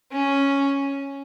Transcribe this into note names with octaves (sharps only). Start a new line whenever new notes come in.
C#4